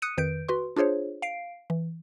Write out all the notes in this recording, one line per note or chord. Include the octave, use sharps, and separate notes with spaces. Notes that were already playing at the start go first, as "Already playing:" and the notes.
D#6 F#6 C#7 D#7
F2 D#3 B4 G6 D7
F#4 B4 C6
D4 F4 G#4 C5 C#5
F5 C7 D7
E3